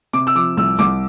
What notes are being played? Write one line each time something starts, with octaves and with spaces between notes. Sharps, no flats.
C3 D6
E6
F3 D6
C2 E6
C2 D6